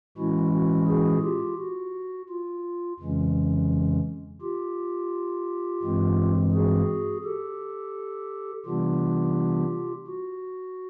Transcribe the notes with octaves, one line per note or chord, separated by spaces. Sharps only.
A2 E3 G#3 C#4 E4 F#4
F#4
F#4 G#4
F4 G4
F#4
F4
F2 C#3 E3 G#3 C#4
F4 G4
G2 E3 G#3 C4
F#4 G#4
G4 A4
C3 E3 G3 B3 D4 F4 G4
F#4